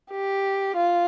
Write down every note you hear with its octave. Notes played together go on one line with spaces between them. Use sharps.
G4
F4